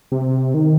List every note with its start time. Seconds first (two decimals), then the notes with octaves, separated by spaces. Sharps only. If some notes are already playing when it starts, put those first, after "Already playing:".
0.12 C3
0.54 D#3